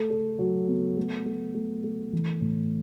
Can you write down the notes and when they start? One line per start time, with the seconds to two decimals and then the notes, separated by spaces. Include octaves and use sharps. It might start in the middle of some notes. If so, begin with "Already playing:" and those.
Already playing: A3 A4
0.10 A4
0.39 F#3
0.68 B3
0.97 A3
1.26 A3
1.55 A3
1.84 A3
2.13 E3
2.41 A2